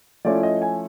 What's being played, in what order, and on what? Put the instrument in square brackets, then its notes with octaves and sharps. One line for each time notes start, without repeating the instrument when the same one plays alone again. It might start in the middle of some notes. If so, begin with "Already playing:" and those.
[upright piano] F3 A3 C#4 E4 D5
D#5
G#5